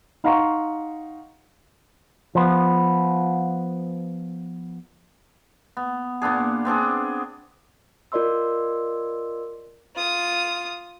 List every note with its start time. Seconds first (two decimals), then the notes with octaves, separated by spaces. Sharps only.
0.24 D#4 F5 F#5 A#5 C6 C#6
2.35 F3 B3
5.77 B3
6.22 A#2 B3 D4 G#4
6.65 B3 C4 D4 G#4
8.12 F4 A#4 D5 D#5 C6 E6
9.95 F4 D#6